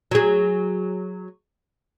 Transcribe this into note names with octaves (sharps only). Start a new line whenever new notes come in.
F#3 G#4